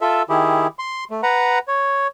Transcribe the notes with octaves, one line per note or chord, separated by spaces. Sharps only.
F4 A4 E5
D#3 E4 G4 G#4
C6
A3
B4 F#5 A#5
C#5